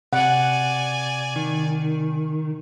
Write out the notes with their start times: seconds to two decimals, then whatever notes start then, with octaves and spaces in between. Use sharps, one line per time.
0.13 C3 D5 F#5 G#5
1.36 D#3